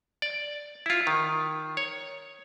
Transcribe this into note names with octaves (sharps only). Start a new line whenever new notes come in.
D5
E4 F4
D#3
C#5